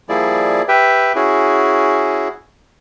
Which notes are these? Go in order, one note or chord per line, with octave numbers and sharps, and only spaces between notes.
F3 G3 A#3 E4 G#4 D5
G4 B4 E5 G5
C#4 E4 F#4 G#4